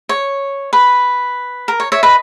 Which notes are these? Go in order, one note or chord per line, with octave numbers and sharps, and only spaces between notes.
C#5
B4
A#4
C#5
C#5 E5
B4 D#5